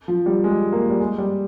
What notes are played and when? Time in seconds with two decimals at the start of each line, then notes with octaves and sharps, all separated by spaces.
0.08 F3
0.26 G3
0.44 G#3
0.72 A#3
0.90 G3
1.00 G#3
1.18 G3